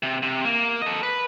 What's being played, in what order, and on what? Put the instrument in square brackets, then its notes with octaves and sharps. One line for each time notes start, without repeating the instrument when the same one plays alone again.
[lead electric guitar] C3
C3
A#3
A4 D#5
B4